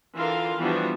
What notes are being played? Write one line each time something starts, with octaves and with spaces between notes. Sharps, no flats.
D3 E3 F4 A#4 F5 C6
E3 F3 G3 B3 D4 F#4